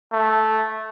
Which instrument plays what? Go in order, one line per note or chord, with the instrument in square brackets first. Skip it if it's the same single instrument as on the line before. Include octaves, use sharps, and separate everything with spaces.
[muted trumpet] A3